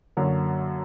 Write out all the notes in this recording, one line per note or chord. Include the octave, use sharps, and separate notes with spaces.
F#2 D3 F#3 A#3 C#5